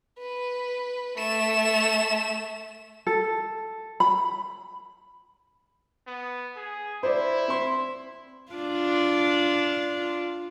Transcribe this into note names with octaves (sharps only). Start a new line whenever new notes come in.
B4
A3 E7
A4
B5
B3
G#4
E4 C5 D5
C4 C6
D4 F4